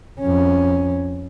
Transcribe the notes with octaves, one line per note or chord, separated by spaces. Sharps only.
F2 C#4